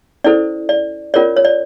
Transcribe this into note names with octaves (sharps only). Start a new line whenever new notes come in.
C#4 E4 A4 C5 D5
D5
C#4 F4 A#4 C#5 D5
C#5
D5